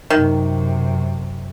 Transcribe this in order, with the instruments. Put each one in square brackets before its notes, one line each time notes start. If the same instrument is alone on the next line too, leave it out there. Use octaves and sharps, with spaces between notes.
[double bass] F#2 C3 [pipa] D#3